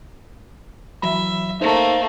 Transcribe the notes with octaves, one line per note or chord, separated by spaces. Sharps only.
E3 F#3 E5 B5
A3 A#3 D#4 C5